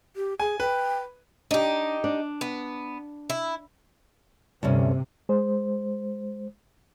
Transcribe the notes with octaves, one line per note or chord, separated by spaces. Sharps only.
G4
G#4 G#5
B4 G5
D4 D#4 G4
D4
B3
E4
D2 G2 C3 C#4
G#3 C5